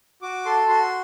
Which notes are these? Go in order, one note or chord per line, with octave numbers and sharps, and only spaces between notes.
F#4 D6
A4 C6
F#4 C6